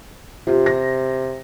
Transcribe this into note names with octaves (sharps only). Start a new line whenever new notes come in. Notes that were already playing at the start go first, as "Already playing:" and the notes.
C3 F4 G4
A#6